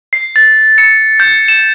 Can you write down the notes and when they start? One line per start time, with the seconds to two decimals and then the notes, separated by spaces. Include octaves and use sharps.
0.13 C7
0.36 A6
0.78 C#7
1.20 G6
1.48 E7